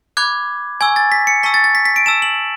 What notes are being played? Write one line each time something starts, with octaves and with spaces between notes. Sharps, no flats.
B5 D6 F#6 G#6
G#5 C#6 E6 G#6
A6
B6
C#7
A5 C#6 E6 B6
A6
A6
B6
B6
D7
A5 E6 E7
F#7